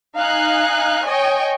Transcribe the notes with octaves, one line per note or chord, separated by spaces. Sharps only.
D#4 F5 G#5 F#6
C#5 D#5 G5 G#5